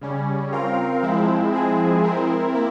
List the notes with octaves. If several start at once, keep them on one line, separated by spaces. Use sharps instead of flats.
C#3 G3 C#4
C4 F4 A#4 F5
F3 G#3 C4 E4
F3 G#3 C4 E4 G#4
C4 E4 A#4
A#3 E4